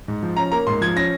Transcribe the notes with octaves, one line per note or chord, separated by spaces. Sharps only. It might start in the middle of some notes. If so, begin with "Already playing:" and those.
G#2
F3
C#4 A#5
A#3 A#5
G#2 C6
F3 G#6
C#4 A#6